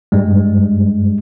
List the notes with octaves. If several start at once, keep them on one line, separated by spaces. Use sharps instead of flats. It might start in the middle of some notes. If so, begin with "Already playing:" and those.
G2 G3 G#3